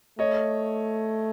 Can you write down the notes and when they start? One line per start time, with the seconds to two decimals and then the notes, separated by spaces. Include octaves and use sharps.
0.19 A3 C#5 D#5